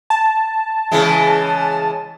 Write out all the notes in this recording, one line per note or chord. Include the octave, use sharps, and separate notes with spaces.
A5
C#3 E3 G#3